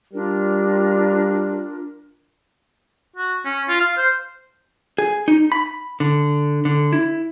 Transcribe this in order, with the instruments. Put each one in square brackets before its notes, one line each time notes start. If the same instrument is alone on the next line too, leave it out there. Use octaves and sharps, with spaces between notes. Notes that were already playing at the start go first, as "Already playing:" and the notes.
[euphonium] G3 [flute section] D4 F4 A#4
[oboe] F#4
C#4
F4
F5
C5
[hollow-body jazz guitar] G#4
D#4
B5
D3
D3
E4